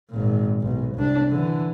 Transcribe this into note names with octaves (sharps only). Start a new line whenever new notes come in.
G#1 A#2
B1
C2 D4
D3 E3